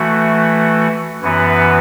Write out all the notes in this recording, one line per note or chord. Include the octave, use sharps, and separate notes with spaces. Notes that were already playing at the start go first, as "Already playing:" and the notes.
Already playing: E3 A3 F#4
F#2 E3 B3 F#4 B4